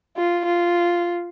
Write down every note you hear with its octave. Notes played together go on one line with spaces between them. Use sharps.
F4
F4